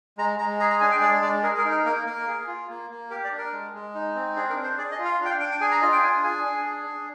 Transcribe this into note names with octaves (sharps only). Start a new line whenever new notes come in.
G#3 A#5
G#3 A#5
G#4 A#5
A#5
D4 G#5
G5
G#3 D5
G#3 D5
G#4 A#4
A#4
D#4
A#4
A#3 A#4
A#3 A#4
G#4
F4
A#3
A#3
G4 A#4
D5
D4
A#4
G#3
G#3
D#4
C4
D4 G#4
A#4
D4
C5
G#4 D5
D#5
F4
F5
D4
G5
F5
D4 G5
G5
G#4 G#5
A#5
F4 D#5
G5
D4 G#5
G#4 G#5
D4
G#4
D4